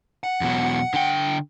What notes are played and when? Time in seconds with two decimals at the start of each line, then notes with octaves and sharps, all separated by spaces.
0.23 F#5
0.41 E2 B2 F#3
0.94 D3 G5